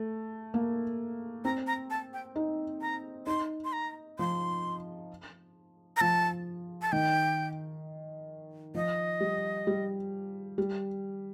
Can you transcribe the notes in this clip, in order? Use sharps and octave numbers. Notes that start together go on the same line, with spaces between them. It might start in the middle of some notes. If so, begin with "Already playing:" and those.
Already playing: A3
A#3
C4 A#5
A#5
A5
G5
D#4
A#5
D#4 C6
C6
A#5
F3 C6
A#5
F3 A5
A5
D#3 G5
F3 D#5
G3
G3
G3